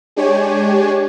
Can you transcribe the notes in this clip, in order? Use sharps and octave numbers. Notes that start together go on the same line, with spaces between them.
G#3 D4 G4 C#5 G#5